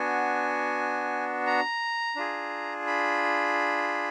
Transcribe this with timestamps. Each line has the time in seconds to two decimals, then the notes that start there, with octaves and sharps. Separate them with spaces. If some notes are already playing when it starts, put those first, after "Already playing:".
Already playing: B3 D4 F#4 G#5
1.46 A#5
2.16 D4 F4 G#4
2.87 B5